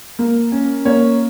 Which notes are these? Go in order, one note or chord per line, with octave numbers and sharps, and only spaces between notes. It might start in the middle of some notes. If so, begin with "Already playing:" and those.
A#3
C#4
A#3 C#5